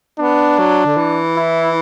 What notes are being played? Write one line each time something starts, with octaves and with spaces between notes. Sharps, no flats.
B3 D4
F#3
D3
E3
E4